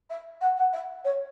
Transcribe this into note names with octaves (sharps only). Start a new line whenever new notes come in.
E5
F#5
F#5
E5
C#5